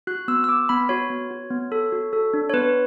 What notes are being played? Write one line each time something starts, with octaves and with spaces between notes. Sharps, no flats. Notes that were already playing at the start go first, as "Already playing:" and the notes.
F#4 F#6
B3 E6
E6
B3 D6
B3 B5
F#4 C#5
B3
F#4
B3
A4
F#4
A4
D4
C#5
B3 B4